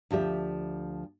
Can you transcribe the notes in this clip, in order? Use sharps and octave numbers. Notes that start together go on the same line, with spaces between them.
D2 F3 G4 E5